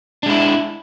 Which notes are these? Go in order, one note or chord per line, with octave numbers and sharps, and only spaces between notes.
G#3 D4 E4